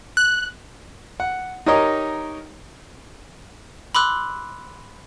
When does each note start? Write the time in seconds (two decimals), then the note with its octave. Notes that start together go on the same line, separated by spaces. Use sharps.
0.17 F#6
1.20 F#5
1.66 D#4 G4 A#4 C#5 D#5
3.95 B5 C6 D6 E6 F#6